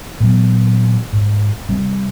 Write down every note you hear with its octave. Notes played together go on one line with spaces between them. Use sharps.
A#2 E3 F#3 B3
G#2
C3 G3 C4